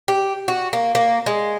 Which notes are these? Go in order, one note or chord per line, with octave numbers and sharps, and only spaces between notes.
G4
F#4
A#3
A#3
G#3